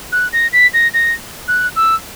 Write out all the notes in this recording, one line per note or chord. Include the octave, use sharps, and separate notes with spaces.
F#6
A#6
B6
A#6
A#6
F#6
E6